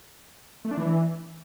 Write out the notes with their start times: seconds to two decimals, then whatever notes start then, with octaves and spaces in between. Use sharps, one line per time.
0.65 A3
0.71 D4
0.78 E3